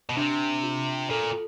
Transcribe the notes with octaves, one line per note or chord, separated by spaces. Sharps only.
B2
C3 D4
F4
A#2 A4